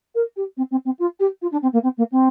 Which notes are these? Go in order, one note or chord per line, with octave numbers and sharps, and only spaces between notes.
A#4
G4
C4
C4
C4
F4
G4
F4
D4
C4
A#3
C4
A#3
C4